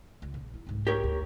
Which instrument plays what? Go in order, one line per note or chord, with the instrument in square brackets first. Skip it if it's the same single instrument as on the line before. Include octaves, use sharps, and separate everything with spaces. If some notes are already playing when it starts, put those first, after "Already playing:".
[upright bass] C#2
A#1
E4
C2 G#2
[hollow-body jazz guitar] G4 A#4 C#5
[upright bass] D2